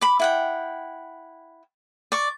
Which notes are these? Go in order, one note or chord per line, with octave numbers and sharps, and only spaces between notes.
B5 D6
E4 F#5 G5
D5 C#6